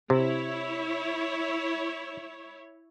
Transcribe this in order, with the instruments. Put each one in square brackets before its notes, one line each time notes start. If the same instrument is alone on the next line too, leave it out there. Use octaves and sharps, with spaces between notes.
[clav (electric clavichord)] C3 [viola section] E4 C#5